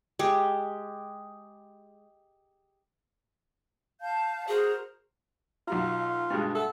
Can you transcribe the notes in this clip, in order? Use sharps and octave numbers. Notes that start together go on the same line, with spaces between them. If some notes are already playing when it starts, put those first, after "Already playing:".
G#3 G4
F5 A5 G6
F#4 G#4 A#4 C5
B1 F4 F#4 A#5
G2 B2 G#3
A4 E5 F#5